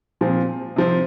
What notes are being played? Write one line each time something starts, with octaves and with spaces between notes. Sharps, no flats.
A#2 F3 C4
C3 F3 C4